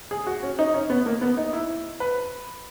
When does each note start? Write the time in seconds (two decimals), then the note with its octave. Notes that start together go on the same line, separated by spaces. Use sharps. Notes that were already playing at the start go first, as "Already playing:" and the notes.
0.11 G#4
0.27 F#4
0.43 C#4
0.59 D#4
0.74 C#4
0.90 B3
1.06 A#3
1.21 B3
1.37 D#4
1.53 E4
2.00 B4